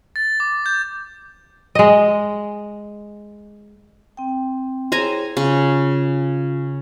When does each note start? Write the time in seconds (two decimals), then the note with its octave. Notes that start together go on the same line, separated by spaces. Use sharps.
0.16 A6
0.40 D6
0.66 G6
1.75 G#3 D#5
4.17 C4 G5
4.92 E4 G#4 C5 C#5 G#5 A#5
5.37 C#3 F4